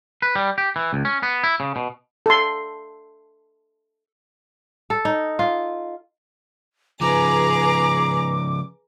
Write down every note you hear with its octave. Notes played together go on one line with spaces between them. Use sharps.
B4
G3
G4
E3
C#2
C#4
B3
E4
C#3
B2
A4 C6
A4
D#4
F4
C#3 F3 G#4 B4 A#5 D6